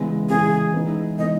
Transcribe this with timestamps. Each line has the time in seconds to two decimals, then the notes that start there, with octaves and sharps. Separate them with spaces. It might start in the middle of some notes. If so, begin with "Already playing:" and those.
Already playing: C#3 E3 G#3 B3
0.29 C#3 E3 G#3 B3 G#4
0.73 E3 G#3 B3 D#4
1.18 E3 G#3 B3 D#4 D#5